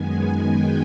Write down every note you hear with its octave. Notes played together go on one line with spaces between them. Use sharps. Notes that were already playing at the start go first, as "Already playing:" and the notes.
Already playing: F#2 D#3 G#3 B3 G#5
G#5
G5